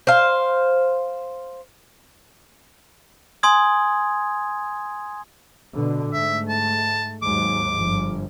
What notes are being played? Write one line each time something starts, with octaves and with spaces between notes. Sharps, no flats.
C5 F5
G#5 C6 D#6 G#6
B2 D3
G#2 A3 E5
A5
D#2 G#2 F#3 D6
G1 F3